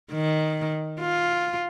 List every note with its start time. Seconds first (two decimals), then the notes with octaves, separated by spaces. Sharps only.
0.12 D#3
1.00 F4